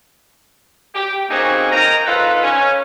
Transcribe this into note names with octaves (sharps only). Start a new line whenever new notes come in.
G4
A#3 C4 C#4 D#4 F#4 G#4
A#4 D#5 G5 A#5
D#4 F4 A4 B4
C#4